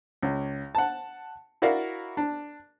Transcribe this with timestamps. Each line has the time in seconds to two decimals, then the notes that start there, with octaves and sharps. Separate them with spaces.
0.23 C#2
0.75 F#5 A5
1.62 E4 F#4 A#4 D5 F5
2.17 D4